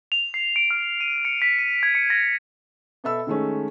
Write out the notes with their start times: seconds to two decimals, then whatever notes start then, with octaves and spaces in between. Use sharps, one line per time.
0.12 F7
0.34 C7
0.56 D7
0.71 F6
1.01 D#7
1.25 C#7
1.42 B6
1.59 D#7
1.83 G#6
1.95 C#7
2.10 A#6
3.04 B2 B3 A4 E5 B5 E6
3.27 D#3 G#3 A3 C#4